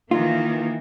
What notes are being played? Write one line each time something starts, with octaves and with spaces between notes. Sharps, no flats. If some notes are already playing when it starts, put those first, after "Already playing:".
D#3 E3 A#3 F4